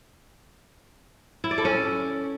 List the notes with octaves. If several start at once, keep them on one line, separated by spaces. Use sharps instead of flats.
E4
D5
A4
C#4